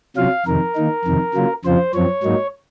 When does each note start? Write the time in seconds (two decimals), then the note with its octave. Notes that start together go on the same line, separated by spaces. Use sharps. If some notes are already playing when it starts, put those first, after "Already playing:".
0.17 C3 F#3 C#4 F4 F5
0.46 F2 C3 D#3 A#4
0.76 D#3 A#3 D#4
1.05 F2 C3 D#3
1.34 C#3 F#3 A#3 F4
1.65 F2 C#3 F3 C4 F4 C5
1.94 F#2 F3 C4 C#5
2.23 G#2 F#3 A#3 D#4